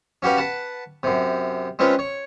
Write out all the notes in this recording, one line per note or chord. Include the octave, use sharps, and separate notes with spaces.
C#4 F#4 G4 B4 F5
B4 F#5 A5
F#2 C3
G#3 C4 C#4 F4 B4
C#5